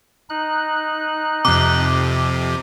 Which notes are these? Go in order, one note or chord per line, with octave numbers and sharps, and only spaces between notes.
D#4 F#6
F2 C3 D6